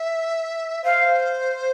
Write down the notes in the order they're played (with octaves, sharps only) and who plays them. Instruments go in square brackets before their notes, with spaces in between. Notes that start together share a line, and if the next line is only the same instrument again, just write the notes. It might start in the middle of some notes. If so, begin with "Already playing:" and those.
Already playing: [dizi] E5
[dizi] C5 [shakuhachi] F5